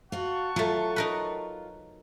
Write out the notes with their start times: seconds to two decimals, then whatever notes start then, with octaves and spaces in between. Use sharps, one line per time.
0.12 F4 F#4 F#5 A5 C#6
0.56 F#3 A3 F4
0.96 D#4 A#4 B4